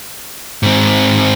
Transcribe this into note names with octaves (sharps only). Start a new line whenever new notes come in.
G#2 C4